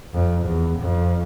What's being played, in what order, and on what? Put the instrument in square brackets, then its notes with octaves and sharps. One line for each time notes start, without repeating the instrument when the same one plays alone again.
[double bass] F2
E2
F2